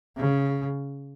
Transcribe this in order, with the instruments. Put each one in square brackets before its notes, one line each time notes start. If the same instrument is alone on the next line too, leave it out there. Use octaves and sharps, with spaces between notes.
[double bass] C#3